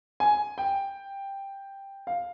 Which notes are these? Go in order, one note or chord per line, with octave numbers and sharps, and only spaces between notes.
G#5
G5
F5